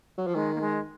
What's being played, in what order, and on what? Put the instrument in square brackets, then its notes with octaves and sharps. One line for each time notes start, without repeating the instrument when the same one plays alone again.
[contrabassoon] F#3
F3
[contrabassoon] D#3 [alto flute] G#3
[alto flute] A#3
G#3